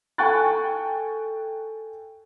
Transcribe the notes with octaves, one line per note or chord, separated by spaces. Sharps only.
A4 G5 G#5 C#6 F#6 A6